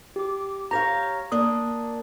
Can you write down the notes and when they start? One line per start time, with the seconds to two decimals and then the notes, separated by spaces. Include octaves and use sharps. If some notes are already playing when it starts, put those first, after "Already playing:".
0.16 G4 D6
0.71 G4 C#5 F5 A#5 A#6
1.32 A#3 D4 D#6